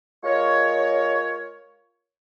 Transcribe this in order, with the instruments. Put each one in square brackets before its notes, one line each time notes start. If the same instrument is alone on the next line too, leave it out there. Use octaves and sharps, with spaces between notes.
[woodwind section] G#3 F4 A#4 C#5